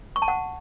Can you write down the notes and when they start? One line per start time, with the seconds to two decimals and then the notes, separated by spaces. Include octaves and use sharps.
0.16 C#6
0.22 A5
0.28 F#5